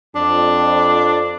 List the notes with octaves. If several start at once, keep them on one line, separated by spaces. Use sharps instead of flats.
F2 D4